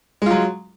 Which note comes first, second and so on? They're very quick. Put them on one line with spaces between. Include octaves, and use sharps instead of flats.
G#3 F4 F#3